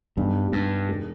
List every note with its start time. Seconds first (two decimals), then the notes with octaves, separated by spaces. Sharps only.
0.17 B1 G2 B2 G3 D4
0.52 G2
0.89 E1 D3